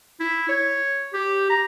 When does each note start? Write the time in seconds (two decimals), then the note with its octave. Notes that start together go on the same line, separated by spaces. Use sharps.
0.20 E4
0.49 C#5
1.13 G4
1.50 A#5